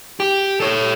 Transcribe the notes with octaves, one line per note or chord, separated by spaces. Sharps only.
G4
A4 C#5